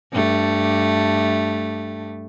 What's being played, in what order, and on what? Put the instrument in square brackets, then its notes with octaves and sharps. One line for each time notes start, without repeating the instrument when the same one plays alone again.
[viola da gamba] G2 A3